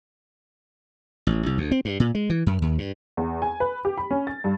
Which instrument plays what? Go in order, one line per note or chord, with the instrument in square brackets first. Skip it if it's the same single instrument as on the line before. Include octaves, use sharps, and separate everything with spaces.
[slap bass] A1
C2
D2
C4
G2
A#2
G#3
E3
F#2
D#2
G2
[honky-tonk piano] E2
G#5
B4
G4
B5
C#4
A6
G2